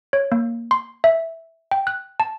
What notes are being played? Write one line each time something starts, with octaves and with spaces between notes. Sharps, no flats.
C#5
A#3
C6
E5
G5
F#6
A5